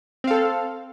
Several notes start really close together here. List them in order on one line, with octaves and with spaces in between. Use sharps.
C4 F5 A4